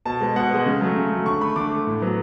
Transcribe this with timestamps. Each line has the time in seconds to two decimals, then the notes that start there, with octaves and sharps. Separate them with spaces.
0.05 B2 A5
0.21 G#3 B3
0.36 B2 F#5
0.51 G#3 B3
0.66 C#3
0.81 F#3 A3
0.96 C#3
1.11 F#3 A3
1.26 D3 C#6
1.41 A3 B5
1.56 D3 D6
1.72 A3
1.87 A2
2.02 F#3 B3